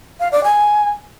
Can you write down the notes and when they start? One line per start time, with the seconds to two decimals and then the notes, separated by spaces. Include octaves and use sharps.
0.20 F5
0.32 D5
0.44 G#5